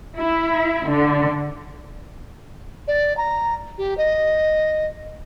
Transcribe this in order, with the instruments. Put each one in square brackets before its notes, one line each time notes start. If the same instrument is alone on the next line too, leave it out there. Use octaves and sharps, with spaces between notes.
[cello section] E4
D3
[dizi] D5
A#5
G4
D#5